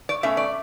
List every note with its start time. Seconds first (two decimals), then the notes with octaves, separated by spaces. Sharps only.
0.09 D5
0.23 B2 A3 C#4 E5
0.37 D5